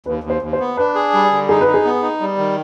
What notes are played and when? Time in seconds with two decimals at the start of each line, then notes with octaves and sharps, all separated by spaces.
0.06 D#2 B4
0.24 D#2
0.30 C5
0.42 D#2
0.53 C5
0.60 B3
0.77 D4 B4
0.95 G#4
1.14 G3
1.32 D3
1.49 D#4 G#4
1.61 B4
1.67 D#4
1.74 G#4
1.85 B3
2.02 D#4
2.21 G3
2.38 D#3